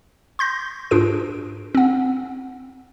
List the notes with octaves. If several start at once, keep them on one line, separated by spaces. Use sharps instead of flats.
C6 G6 A#6
G#2 D4 F4 G#4 D7
C4 F#5